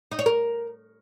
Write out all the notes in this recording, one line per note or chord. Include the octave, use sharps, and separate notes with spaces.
D#4
C#5
A#4